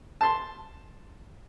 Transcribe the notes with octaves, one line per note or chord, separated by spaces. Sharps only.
A5 C6